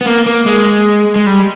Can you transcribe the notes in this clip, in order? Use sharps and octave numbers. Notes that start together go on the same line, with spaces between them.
B3
A#3
A#3
G#3
G#3
G3